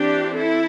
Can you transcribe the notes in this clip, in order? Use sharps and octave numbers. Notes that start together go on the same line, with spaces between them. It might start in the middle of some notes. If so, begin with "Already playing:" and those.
Already playing: E3 C4 D4 G4
E4 A4